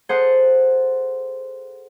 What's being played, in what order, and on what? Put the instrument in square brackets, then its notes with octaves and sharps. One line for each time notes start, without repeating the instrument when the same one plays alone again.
[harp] G#4 A4 C5 F#5